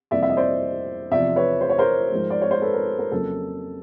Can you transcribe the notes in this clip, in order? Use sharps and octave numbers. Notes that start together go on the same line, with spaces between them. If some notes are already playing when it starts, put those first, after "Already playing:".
F2 C3 E3 G3 A#3 D5 E5
E5
D#5
C5 D5
E2 C3 F3 D5 E5
B4 C#5
C5
C#5
A#4 C5
G#2 F3 G#3
D5
C#5
C5
A4 B4
A#4
A#4
F2 C#3 F#3 A#3 A4